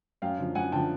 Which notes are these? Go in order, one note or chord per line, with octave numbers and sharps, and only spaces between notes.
F#2 F5 G5
D3 F3
F#2 F#5 G#5
D3 F3 G5 A5